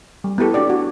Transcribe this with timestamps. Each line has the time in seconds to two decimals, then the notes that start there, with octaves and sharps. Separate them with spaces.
0.24 G3
0.38 B3 E4 G4 A4
0.54 D4 F#4 G4 D5
0.70 F#4